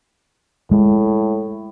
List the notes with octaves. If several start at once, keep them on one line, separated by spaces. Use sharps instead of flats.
A2 G#3